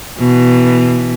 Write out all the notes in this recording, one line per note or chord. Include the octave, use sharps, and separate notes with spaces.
B2 E3